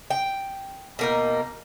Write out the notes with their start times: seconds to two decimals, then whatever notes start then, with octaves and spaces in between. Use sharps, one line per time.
0.10 G5
0.99 B2 A#3 D#4